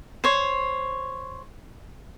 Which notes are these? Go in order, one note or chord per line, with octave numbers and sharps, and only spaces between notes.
C5 C#5